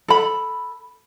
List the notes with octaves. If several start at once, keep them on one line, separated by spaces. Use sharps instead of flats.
A4 B5